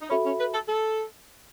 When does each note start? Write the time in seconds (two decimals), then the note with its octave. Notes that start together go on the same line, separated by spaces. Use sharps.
0.02 D#4
0.10 C#4 F#4 A4 E5 B5
0.25 C#4
0.39 B4
0.54 A4
0.69 A4